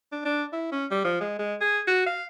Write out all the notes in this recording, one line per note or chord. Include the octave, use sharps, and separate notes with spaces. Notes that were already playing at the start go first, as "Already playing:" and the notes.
D4
D4
E4
C#4
G3
F3
G#3
G#3
G#4
F#4
F5